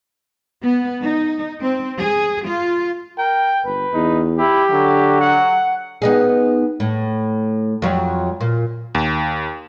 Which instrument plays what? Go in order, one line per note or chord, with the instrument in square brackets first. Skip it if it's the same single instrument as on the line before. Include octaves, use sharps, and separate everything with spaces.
[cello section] B3
D#4
C4
G#4
F4
[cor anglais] A#4 [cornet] G5
[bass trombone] G1 [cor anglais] B4
[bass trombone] E2 [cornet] D#4
[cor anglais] E4 [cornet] G4
[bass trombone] D3 [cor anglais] F#3
[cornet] F#5
[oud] B3 D#4 G#4
A2
F2 F#3
A#2
[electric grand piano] D#2